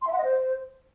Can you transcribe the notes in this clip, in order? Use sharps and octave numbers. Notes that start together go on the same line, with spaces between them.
C6
E5
F#5
D#5
C5